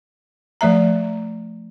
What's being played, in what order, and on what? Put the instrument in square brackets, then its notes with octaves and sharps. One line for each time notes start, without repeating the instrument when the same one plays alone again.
[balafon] F3 A3 E5 A#5